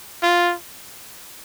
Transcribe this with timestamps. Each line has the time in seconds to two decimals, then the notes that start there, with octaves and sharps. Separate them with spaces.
0.22 F4